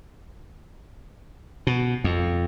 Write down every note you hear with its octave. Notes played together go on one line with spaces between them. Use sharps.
B2
F2